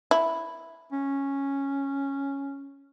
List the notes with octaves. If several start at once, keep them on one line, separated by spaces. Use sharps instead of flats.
E4
C#4